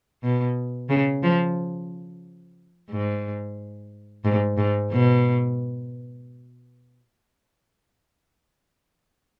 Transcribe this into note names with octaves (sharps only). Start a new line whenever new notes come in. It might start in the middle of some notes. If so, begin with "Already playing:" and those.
B2
C#3
F3
G#2
G#2
G#2
B2